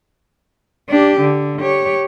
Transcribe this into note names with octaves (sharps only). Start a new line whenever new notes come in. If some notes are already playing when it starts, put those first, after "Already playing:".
D4 G4
D3
G4 C#5